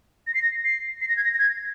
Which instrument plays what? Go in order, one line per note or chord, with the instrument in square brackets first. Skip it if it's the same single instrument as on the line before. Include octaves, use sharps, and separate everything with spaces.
[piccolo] A#6
C7
A#6
C7
C7
A#6
G#6
A#6
A#6
G#6